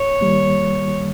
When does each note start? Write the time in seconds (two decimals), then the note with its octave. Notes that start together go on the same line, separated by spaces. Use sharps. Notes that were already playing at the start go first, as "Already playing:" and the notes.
Already playing: C#5
0.21 D#3 G3 A#3